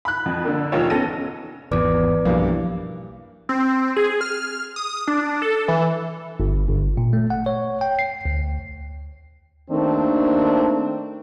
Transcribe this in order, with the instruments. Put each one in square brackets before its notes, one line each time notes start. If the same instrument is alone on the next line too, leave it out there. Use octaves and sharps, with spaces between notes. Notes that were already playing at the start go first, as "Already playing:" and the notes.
[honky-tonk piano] B5 F#6
F2
D3 A#3
F1 D#3 D#4 F4 C#5 E7
B3 C#4 A4 A#6 D#7
[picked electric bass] G#1 E2 [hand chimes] B4 D5 D6
[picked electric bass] B1 [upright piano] G2 E3 A#3 [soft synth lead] F3
[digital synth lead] C4
G#4
F6
D#6
D4
A4
E3
[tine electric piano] G1
G1
A#2
A3
F#5
C#5
G5
C7
D2
[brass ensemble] D#2 D#3 A3 A#3 C4 D4